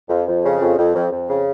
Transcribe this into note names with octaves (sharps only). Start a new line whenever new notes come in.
F2
F2
C#3
F2
F2
F2
F2
C#3